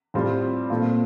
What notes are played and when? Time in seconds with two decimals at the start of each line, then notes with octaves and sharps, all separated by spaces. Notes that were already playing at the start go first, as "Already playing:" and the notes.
0.14 A2 G3 C4 F4
0.70 A#2 A3 C4 F4